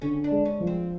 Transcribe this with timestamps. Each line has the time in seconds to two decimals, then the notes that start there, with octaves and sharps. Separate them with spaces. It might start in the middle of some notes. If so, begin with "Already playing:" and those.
0.02 D3 C#4
0.24 D4
0.31 G#3
0.45 C#4
0.60 F3
0.67 C4